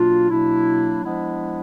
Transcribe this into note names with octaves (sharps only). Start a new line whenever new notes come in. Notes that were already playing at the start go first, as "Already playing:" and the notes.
Already playing: B2 F#3 A#3 D4 F4
B2 F#3 A#3 D4 E4
F3 G#3 B3 D4 E4